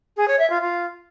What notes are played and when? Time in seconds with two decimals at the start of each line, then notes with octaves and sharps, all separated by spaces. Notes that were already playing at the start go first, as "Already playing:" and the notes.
0.17 G#4
0.28 C#5
0.39 E5
0.50 F4
0.61 F4